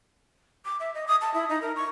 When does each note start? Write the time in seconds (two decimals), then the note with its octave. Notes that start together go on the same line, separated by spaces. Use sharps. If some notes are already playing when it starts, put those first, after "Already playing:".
0.65 D6
0.80 E5
0.94 D#5
1.08 D#6
1.21 A5
1.34 E4
1.49 D#4
1.62 A#4
1.76 C#6